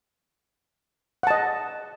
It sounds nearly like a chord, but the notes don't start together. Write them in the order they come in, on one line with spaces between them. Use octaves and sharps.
F#5 A5 D#5